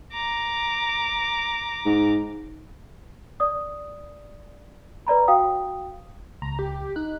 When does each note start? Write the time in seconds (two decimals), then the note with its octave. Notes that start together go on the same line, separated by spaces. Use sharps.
0.12 A#5 D6
1.86 G#2
3.40 D5 D#6
5.07 B4 D5 A#5 B5
5.28 F#4 F5 G5 D#6
6.42 C#2 A#5
6.59 G4
6.96 D#4 F#6